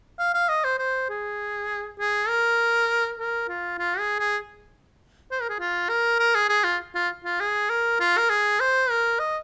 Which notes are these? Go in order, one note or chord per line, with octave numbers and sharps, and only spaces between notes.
F5
F5
D#5
C5
C5
G#4
G#4
A#4
A#4
F4
F4
G#4
G#4
C5
A#4
G#4
F4
A#4
A#4
G#4
G#4
F4
F4
F4
G#4
A#4
F4
A#4
G#4
C5
A#4
D#5